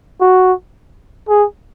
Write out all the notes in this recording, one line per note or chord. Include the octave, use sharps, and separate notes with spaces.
F#4
G#4